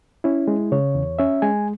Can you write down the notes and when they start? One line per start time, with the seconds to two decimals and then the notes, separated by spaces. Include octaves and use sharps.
0.24 C#4 E4
0.48 G#3
0.72 C#3 C#5
0.95 E2
1.19 C#4 E5
1.42 G#3 G#5